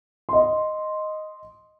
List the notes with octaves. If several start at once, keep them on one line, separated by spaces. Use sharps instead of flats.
D#5 C6